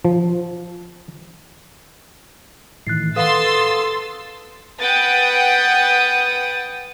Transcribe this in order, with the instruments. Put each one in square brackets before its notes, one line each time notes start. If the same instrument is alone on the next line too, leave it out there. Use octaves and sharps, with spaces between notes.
[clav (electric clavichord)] F3
[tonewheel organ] A2 D#3 E3 [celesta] F#6 A6 C7
[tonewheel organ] A4 D#6 [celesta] B4 F5 F#5 [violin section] C6 E6 A6
[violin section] B4 F#5 G5 D#6 A6